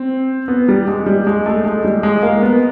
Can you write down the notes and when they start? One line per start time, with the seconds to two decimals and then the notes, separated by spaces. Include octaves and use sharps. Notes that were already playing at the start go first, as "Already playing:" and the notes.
Already playing: C4
0.48 B3
0.68 G3
0.88 G#3
1.06 G3
1.27 G#3
1.46 A3
1.64 G#3
1.84 G3
2.03 G#3
2.22 A#3
2.42 B3